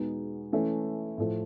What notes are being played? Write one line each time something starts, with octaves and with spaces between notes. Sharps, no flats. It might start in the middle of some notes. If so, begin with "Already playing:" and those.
Already playing: E2 B2 G#3 B3 D#4
E3 A3 C#4 E4
A2 F3 A3